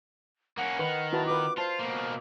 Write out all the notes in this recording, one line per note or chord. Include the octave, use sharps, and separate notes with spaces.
A#3 C#4 F#5
D#3 B4
E4 F#4 B4 A5
F4 B4 D6
F4 C5 A5
B2 A#3